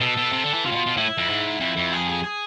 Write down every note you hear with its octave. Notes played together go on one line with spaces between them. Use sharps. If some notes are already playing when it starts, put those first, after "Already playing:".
B2 A4
B2
C3
D3
E3
C3 F4
A2
B2
B2
A2 E4
F2
G#2
F2
F2
G#4
G#4
G#4